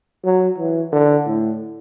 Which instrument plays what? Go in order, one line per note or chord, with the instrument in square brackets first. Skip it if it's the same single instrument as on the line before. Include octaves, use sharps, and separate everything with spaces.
[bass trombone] F#3
E3
D3
A2